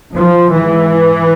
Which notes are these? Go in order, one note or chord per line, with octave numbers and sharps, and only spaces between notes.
F3
G#2 E3